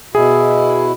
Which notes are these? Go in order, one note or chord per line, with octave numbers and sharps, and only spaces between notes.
B2 E4 G#4